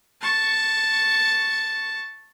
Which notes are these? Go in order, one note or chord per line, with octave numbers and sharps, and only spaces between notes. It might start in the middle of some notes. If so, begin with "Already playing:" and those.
A5 C#6